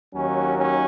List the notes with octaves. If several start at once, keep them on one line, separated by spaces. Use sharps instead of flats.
D#2 D#3 F#3 C#4
C#4